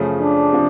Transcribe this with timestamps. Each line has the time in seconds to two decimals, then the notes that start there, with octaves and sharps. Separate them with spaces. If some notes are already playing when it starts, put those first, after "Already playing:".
Already playing: F#2 C#3 F3 A3
0.19 D4
0.52 C3 F3